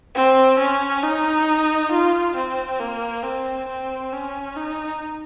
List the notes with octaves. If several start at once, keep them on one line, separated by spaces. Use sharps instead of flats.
C4
C#4
D#4
F4
C4
A#3
C4
C4
C#4
D#4